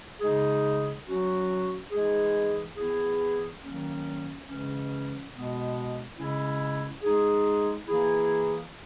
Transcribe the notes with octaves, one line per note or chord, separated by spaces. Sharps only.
C#3 G#3 D#4 G#4
F#3 C#4 F#4
E3 G#3 D#4 G#4
E3 B3 E4 G#4
D#3 F#3 A#3 C#4
C#3 E3 G#3 C#4
B2 G#3 B3
C#3 G#3 C#4 E4
G#3 D#4 G#4
E3 A#3 E4 G#4